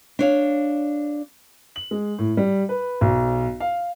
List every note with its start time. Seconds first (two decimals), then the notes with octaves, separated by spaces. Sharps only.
0.19 D4 C#5 F5
1.76 F#7
1.91 G#3
2.19 A2
2.37 G3
2.69 B4
3.01 B1
3.60 F5